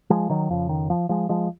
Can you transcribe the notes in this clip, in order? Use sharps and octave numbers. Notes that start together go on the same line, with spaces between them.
F3 G#3
D#3 F#3
F2 C#3 F3
D#3
F3
F3 G#3
F3 G#3